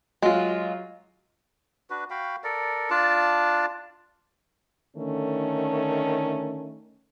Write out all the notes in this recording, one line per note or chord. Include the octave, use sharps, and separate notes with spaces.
F#3 G#3 F4
D4 F#4 B4
F#4 F5 G5 B5
A4 A#4 D5
D4 F4 D5 A5
D3 D#3 A3 C#4